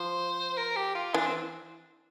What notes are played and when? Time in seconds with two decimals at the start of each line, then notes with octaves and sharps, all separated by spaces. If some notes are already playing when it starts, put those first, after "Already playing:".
Already playing: F3 C5
0.57 A#4
0.76 G4
0.95 F4
1.14 E3 D4
1.27 C4